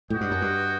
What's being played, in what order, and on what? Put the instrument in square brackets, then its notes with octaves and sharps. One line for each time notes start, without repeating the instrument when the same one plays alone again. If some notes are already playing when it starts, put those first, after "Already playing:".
[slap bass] A2 [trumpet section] F#4 B4 D#5 G5
[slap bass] G2
F#2
G2